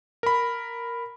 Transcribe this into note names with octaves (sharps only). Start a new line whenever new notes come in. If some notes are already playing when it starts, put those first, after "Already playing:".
A#4 B5